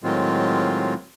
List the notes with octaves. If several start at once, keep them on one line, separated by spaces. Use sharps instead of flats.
A2 D#3 F#3 G#3 C4 F4